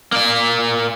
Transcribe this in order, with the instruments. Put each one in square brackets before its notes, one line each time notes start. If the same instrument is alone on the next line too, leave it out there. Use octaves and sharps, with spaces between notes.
[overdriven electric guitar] A#3 D5